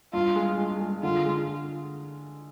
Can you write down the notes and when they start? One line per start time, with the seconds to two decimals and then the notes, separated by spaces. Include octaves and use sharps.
0.13 G2 F4
0.36 G#3
0.58 G#3
0.81 G#3
1.03 D3 F4
1.25 G#3